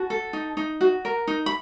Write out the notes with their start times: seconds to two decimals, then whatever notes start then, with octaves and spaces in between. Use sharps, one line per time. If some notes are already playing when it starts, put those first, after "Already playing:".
Already playing: F#4 A5
0.10 A4
0.33 D#4
0.57 D#4
0.81 F#4
1.05 A#4
1.27 D#4
1.46 B5